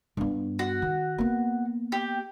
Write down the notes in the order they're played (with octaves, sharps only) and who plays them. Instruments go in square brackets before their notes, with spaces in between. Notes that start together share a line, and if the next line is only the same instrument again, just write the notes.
[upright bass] G2 B3
[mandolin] F#4
[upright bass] D#3
A#3 B3
[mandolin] G4